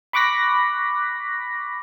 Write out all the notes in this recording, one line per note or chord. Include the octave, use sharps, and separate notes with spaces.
B5 C#6 D6 F#6 A#6 B6